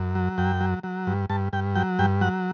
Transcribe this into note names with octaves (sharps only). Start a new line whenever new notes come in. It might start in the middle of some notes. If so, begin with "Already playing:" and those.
Already playing: F#2
F#3
F#2 G5
F#3
F#3
G2
G2 A5
G2 G5
F#3 G5
G2 G5
F#3 F#5